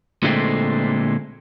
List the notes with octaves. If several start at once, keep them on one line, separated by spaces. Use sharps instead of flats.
A#2 D3 G#3 A3 C4